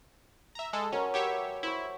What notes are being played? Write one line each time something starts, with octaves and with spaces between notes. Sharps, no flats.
E5 A#5
G#3 A4
F#3 C#4 A#4 G#5
G4 B4 C#5 E5 F#5
E4 C5 C#6